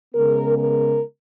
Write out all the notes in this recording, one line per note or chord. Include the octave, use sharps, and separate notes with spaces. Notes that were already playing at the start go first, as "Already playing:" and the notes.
C#3 G#3 B3 A#4
A#4